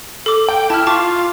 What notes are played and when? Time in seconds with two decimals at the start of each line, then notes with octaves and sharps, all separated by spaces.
0.26 A4 D6
0.49 G5
0.70 E4 A5 F6
0.87 F4 A5 C#6 D6